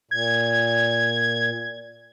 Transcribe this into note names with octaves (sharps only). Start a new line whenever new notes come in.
A#2 G#6